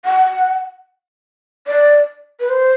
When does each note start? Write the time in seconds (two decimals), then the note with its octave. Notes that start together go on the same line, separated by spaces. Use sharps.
0.05 F#5
1.67 D5
2.40 B4
2.49 C5